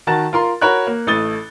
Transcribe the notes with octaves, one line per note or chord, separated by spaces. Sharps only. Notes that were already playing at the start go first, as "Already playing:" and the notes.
D#3 F#4 A#4 A5 A6
F4 A#4 C6
F#4 A#4 C#5 B5 F#6
A#3
A1 A3 D#6 A6 G7